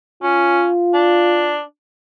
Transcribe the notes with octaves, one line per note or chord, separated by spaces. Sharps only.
C#4 F4
D4